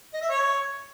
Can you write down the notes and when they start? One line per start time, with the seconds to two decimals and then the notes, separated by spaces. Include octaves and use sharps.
0.14 D#5
0.21 E5
0.29 C#5